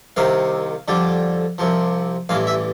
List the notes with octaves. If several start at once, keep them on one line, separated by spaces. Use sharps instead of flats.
C2 C3 D#3 F5
F2 D3 G3
C2 C3 F3
A1 G2 E3 F5
E5